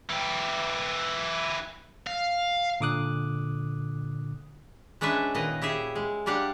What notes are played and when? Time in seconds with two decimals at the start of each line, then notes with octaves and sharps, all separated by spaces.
0.10 E3 G4
2.07 F5
2.80 A#2 D3 D6 D#6 F#6
5.01 G#3 C#4 D4 B4 E5
5.34 A#2 D#3 B4 D#5
5.62 E4 G4 G#4 E5
5.95 G#3
6.26 G3 D4 G4 F5 F#5